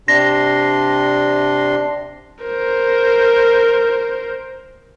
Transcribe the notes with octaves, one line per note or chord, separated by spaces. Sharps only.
C3 D4 C6 A#6
A#4 C5